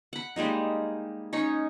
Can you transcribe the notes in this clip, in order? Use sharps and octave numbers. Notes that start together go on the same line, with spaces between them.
F#5 B5
G3 G#3 A#3 D#4
C#4 D#4 C#5